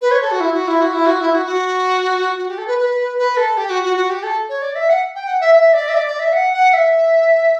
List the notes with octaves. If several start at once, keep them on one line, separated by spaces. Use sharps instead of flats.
B4
C#5
A4
F#4
E4
F#4
E4
F#4
E4
F#4
E4
F#4
F#4
F#4
G4
A4
B4
B4
B4
A4
G4
F#4
F#4
F#4
G4
A4
C#5
D5
E5
F#5
G5
F#5
E5
E5
D5
E5
D5
D5
E5
F#5
F#5
E5